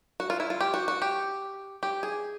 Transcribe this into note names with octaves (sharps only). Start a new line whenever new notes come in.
F#4
F4
E4
F4
G4
F#4
F#4
G4
G4
G#4